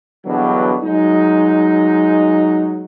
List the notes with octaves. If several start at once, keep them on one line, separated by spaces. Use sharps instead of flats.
E2 G2 B2 D3 F#3
F#3 G#3 D#4